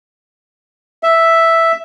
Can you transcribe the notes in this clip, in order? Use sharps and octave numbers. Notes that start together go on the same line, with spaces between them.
E5